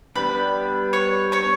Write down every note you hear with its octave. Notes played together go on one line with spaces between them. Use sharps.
G3 B3 D4 G4 B4 B5
C#5 C#6
C#5 C#6